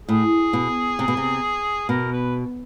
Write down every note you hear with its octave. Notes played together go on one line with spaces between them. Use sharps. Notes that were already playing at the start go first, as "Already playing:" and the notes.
A2 G#4
B2
C3
B2
C3
B2 A#4
B4